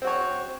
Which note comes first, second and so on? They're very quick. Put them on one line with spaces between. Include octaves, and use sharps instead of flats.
C4 F#4 C#5